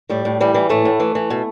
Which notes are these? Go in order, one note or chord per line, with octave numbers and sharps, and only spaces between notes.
A2 G3
A2
E3 G3
E3
A2 A3
A2
E3
E3
B2